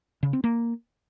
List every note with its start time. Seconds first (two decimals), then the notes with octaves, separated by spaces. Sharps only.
0.23 C#3
0.33 C4
0.44 A#3